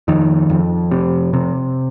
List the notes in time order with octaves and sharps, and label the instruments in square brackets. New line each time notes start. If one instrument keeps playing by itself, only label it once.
[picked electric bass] F2 D#3
F2
C3
C3